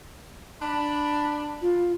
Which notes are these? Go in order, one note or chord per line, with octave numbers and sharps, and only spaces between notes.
D4 B5
F4